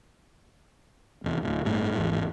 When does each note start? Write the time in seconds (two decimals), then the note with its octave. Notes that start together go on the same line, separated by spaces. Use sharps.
1.24 F1 E2
1.43 D1
1.65 G1 A2
1.96 G#1 E2